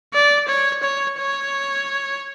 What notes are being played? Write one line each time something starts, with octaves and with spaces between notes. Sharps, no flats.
D5
C#5
C#5
C#5